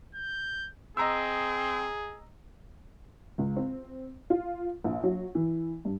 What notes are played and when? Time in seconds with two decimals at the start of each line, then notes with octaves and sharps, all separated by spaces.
0.15 G6
0.97 C4 G#4 D#5 A#5 E6
3.38 C#2
3.57 C4
4.30 F4
4.84 A#1
5.03 F#3
5.35 E3
5.85 G2